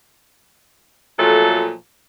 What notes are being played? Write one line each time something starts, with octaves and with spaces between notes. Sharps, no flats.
A#2 F3 F#3 A3 F4 A4